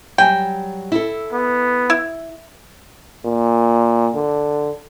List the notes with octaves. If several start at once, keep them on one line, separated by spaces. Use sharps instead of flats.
F#3 G3 G5 G#5
E4 A4
B3
E4
A#2
D3